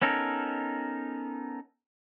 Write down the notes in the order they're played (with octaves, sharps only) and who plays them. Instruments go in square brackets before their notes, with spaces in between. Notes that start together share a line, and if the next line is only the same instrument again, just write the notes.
[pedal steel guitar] B3 C#4 D#4 A4 A#4